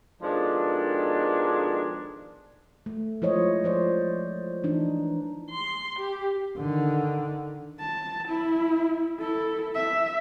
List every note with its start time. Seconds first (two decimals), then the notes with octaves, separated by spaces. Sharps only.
0.22 B2 D#3 F3 G#3 D4 A4
2.86 A3
3.22 F3 G#3 E4 C5 C#5 D#5
3.64 F3 C5 D5
4.64 E3 D4 D#4
5.51 C6
6.00 G4
6.58 D3 D#3
7.79 A5
8.28 E4
9.20 E4 A4
9.75 E5